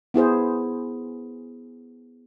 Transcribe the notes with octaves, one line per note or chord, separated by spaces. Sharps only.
B3 E4 G#4 C5